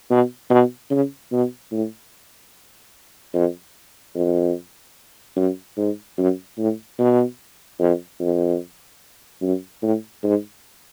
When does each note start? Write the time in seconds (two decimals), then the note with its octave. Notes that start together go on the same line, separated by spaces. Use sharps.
0.10 B2
0.50 B2
0.90 C#3
1.32 B2
1.72 A2
3.34 F2
4.15 F2
5.36 F#2
5.77 G#2
6.18 F#2
6.58 A2
6.99 B2
7.80 F2
8.20 F2
9.42 F#2
9.82 A2
10.23 G#2